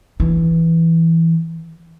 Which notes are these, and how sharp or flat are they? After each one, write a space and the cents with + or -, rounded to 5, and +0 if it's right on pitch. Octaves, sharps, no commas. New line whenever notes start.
E3 +0 D4 +0